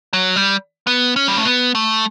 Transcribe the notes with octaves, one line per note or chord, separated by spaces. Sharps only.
F#3
G3
B3
C#4
G3
A3
B3
A3